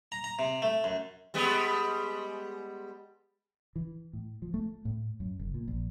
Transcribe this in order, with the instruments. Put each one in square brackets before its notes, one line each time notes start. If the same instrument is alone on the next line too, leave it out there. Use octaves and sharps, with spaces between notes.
[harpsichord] A#5
A#5
C3
A3
F#2
[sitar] G3 G#3 B3
[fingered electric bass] E3
A2
F3
A3
A2
F#2
F#1
A#2
A#1